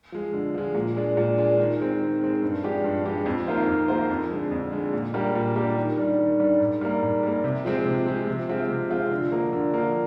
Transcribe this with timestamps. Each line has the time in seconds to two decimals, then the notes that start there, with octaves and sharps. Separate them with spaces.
0.12 F3 G#3
0.33 D3
0.54 F3 G#3
0.75 A#2
0.96 G#3 D4
1.17 A#2
1.38 G#3 D4
1.59 D#3
1.79 G#3 C4
2.00 D#3
2.21 G#3 C4
2.42 G2
2.63 F3 G#3 D4 G4
2.84 G2
3.05 F3 G#3 D4 G4
3.26 F2
3.47 D#3 A#3 F4 C5
3.68 F2
3.88 D#3 A#3 F4 C5
4.10 F2
4.30 D3 G#3
4.51 F2
4.72 D3 G#3
4.93 A#2
5.14 G3 A#3 D4 G4
5.35 A#2
5.56 G3 A#3 D4 G4
5.77 D#3
5.98 G3 D4
6.19 D#3
6.40 G3 D4
6.60 G#2
6.81 G3 A#3
7.02 G#2
7.23 G3 A#3
7.44 C3
7.65 F3 G#3 C4
7.85 C3
8.06 F3 G#3 C4
8.27 C3
8.48 F3 G#3 C4 F4
8.69 C3
8.90 F3 G#3 C4 F4
9.11 D3
9.32 F3 A#3
9.53 D3
9.74 F3 A#3